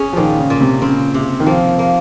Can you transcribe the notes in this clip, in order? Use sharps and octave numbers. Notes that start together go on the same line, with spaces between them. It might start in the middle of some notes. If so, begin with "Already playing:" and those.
Already playing: C#4 G#4
F3
A#2 D#3
C#3
A#2
C3
C#3 C4
C3
D#3
F3 A#3
A#3